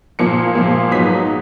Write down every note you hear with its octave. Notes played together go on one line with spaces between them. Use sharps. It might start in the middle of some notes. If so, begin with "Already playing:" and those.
A#2 F3 A#3 C#7
A#2 F3 A#3
G#2 F#3 B3 D#4 B6